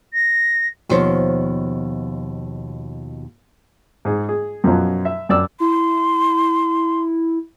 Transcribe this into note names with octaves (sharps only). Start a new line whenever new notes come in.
A#6
D#2 B2 F3 C5 C#5
G#2 G#4
G#4
F#2 B2 F3 F#3
E5
F#2 D5 E6
E4 C6